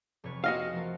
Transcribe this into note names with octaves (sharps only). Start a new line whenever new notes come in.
F1 B4 C#5
F#4 D#5 F5
F3 A3 A#4